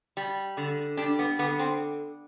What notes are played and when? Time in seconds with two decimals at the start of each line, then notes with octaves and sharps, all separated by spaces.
0.17 G3
0.57 D3
0.97 G3 D4
1.19 B3
1.39 D3 B3
1.59 C4